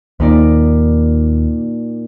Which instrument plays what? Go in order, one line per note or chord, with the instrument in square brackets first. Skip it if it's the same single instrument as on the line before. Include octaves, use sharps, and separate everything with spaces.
[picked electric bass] D#2 [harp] A#2 D#4 D5